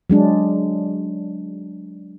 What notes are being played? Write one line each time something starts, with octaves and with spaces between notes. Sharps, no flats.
F#3 G#3 D4